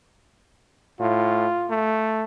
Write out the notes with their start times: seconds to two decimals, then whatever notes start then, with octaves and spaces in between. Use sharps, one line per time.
1.00 A2 F4
1.70 A3